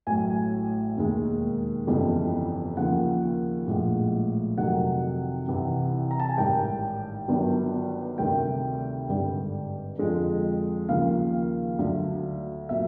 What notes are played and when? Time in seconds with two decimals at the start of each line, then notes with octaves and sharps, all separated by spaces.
0.07 A1 A2 F#3 G#5
0.97 E1 D#2 D#3 G#3
1.87 G1 F2 C#3 E3 G3
2.77 D#2 C#3 F3 F#5
3.67 A#1 A2 F3 G#3
4.58 F2 C3 D#3 F#3 F#5
5.48 C2 C3 E3
6.11 A#5
6.20 A5
6.29 G#5
6.38 A1 G#2 D#3 G3 G5
7.28 G1 G2 D#3 F#3
8.18 D2 C3 D#3 G3 G5
9.08 G#1 G2 D3 G3
9.98 F2 D3 F3 G#3
10.89 D#2 C#3 F3 F5
11.79 D2 D3 F#3
12.69 A#2 F#3 E5